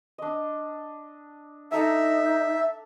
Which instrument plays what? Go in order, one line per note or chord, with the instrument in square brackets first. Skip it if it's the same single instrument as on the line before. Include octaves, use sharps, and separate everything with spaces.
[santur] D4 D#5
[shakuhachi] D#4 [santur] A4 A#5 [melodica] E5